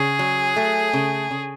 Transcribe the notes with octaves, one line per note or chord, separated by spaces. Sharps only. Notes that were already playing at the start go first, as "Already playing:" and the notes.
Already playing: C#3 G#4
F#3
A3
C#3
C#3